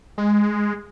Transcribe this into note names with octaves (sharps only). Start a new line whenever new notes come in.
G#3